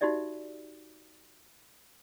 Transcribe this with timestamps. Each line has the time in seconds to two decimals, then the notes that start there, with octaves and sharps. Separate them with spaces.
0.01 D#4 F#4 G4 D5 E5